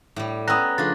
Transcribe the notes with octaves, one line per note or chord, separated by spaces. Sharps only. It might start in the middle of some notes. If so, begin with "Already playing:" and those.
A2 G3
B3 C#4 G5 A#5 D#6 E6 F#6 A#6
C#3 F3 A3 D4 D#4 F4 A6